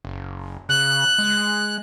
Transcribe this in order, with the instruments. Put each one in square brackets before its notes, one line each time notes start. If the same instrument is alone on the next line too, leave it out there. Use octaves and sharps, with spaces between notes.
[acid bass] F#1
[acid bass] C#3 [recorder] F#6
[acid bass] G#3